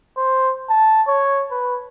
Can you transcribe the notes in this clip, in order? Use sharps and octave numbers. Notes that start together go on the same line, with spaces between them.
C5
A5
C#5
B4